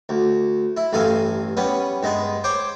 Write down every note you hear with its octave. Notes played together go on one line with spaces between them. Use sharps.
D2
E4
A1 G2 A4 F5 G#5
G3 B3 C#4
G2 G#3 B3
C5 C#5 G5 D6